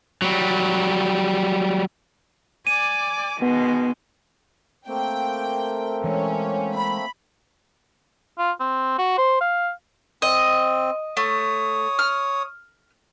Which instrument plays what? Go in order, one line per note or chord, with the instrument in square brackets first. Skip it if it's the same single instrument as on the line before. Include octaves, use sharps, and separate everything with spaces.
[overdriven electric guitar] F#3 G3
[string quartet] D5 G#5 D6 [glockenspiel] D#7
[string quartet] B2 D#3 G#3 [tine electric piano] B3
[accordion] A3 A#3 C4 [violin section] G5
[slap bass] E3 G#3 [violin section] C#4
[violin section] B5
[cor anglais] F4
C4
F#4
C5
F5
[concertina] C4 [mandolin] D#5
[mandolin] A3 [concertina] C#5 D#6
[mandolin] F6